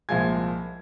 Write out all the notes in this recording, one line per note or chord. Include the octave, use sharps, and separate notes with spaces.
C2 A#2 F3 G#3 G#5 G#6